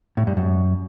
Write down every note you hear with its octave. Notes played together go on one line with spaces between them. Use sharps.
A2
G2
F#2